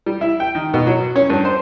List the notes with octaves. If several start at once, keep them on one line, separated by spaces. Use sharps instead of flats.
G3
E4
G5
D#3
B2
F#3
C#4
G2
C5